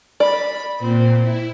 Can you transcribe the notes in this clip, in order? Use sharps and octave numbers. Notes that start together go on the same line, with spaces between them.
D5 B5
A#2 C4
E4